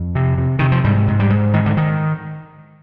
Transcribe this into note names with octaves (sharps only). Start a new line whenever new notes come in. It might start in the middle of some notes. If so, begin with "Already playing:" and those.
Already playing: F2
C3
C3
C3 D#3
F3
G#2 G3
G#2
G3
G#2
G#2 D#3
D3
D#3